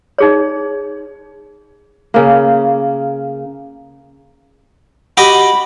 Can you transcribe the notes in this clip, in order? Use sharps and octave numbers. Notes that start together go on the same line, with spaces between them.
D#4 G#4 C#5
C#3 A#3
F#4 G4 D#5 B5